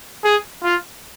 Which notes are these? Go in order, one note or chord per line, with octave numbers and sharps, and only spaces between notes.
G#4
F4